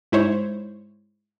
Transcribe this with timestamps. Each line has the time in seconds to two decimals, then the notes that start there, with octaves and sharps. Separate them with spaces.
0.12 G#2 E4 C5 C#5